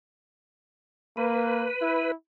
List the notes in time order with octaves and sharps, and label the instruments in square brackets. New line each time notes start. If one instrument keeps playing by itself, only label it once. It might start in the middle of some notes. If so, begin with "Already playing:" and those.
[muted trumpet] A#3 [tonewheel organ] B4
[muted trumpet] E4